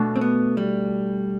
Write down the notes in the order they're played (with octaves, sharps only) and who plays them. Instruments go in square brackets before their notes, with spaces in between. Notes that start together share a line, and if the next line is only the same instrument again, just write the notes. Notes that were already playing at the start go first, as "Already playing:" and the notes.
Already playing: [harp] B2 A3 D4
[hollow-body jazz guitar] C4
B3
G3